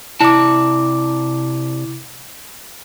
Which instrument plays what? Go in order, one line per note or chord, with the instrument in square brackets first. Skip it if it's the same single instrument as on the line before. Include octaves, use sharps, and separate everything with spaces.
[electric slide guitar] C3 D5 A5 [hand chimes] E4 D6